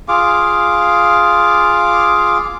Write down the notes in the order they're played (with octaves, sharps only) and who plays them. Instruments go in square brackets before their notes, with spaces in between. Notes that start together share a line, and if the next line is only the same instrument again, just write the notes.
[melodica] F4 G#4 F5 D6